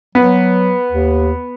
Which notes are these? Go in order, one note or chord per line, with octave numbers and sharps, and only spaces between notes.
F#3 B3
D#2